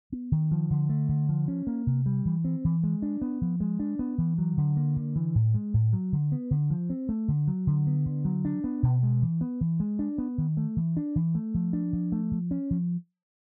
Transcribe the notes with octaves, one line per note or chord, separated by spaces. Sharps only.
B3
D#3
F3
D3
A3
D3
F3
C#4
A#3
C3
G3
E3
C4
E3
G#3
D4
B3
F3
G#3
D4
B3
E3
F#3
D3
A#3
D3
E3
A2
G#3
A2
F#3
D3
B3
D3
F3
C4
A3
D3
F#3
D3
B3
D3
F#3
D4
B3
B2
G#3
E3
B3
E3
G#3
D4
B3
D#3
A3
E3
D4
E3
A3
F3
D4
F3
A3
F3
C#4
F3